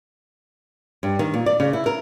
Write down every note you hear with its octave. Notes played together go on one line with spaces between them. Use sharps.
G2
D#3
A#2
D5
C#3
E4
A#4